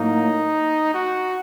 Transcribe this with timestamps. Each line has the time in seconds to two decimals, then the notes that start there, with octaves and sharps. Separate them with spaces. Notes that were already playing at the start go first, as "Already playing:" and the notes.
Already playing: A2 F#3 A#3 D#4
0.94 F#4